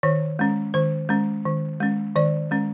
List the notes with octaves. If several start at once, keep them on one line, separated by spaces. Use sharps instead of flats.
D#3 C#5
G#3 C#4
D#3 C5
G#3 C#4
D#3
G#3 C#4
D#3 D5
G#3 C#4